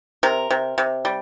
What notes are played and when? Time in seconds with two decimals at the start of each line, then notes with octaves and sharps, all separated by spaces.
0.23 C3 A#4
0.50 C3
0.78 C3
1.05 G3